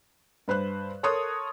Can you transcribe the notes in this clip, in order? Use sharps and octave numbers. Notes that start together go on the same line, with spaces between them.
G2 B4 C5 F#6
A4 A#4 C#5 C6 D#6 F#6